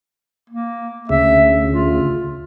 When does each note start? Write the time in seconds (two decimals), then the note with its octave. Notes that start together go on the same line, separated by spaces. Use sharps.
0.50 A#3
1.09 D2 C#3 E5
1.72 F4